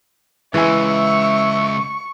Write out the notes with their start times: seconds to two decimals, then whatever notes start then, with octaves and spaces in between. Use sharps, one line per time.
0.54 C#3 E3 G#3 E5 G#5 C#6